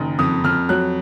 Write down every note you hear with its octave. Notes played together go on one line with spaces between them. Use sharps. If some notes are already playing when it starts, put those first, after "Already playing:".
Already playing: F#1 D#3
F2 D#6
F2 F6
F#3 F#6